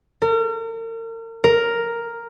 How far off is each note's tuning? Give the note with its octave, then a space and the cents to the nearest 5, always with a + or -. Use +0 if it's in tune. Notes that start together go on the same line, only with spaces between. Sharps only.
A#4 -40
A#4 +0